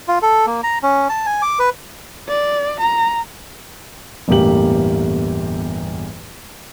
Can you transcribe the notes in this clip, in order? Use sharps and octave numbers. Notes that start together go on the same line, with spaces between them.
F4
A4
A#3
A#5
C#4
A5
G#5
D6
B4
D5
A#5
G1 E2 A2 A#3 G4 F#7